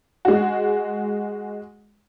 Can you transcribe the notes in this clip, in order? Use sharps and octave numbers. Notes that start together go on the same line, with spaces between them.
G#3 F#4